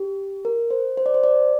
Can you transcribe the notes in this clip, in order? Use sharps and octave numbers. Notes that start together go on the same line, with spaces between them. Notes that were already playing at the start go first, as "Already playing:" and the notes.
Already playing: G4
A#4
C5
C5
D5
C5
D5